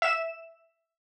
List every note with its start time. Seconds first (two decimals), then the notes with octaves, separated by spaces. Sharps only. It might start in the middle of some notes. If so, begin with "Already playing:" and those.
0.02 E5 E7